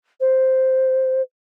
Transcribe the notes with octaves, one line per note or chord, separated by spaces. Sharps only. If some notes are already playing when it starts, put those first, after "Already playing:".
C5